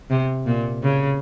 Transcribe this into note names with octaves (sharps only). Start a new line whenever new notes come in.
C3
A#2
C#3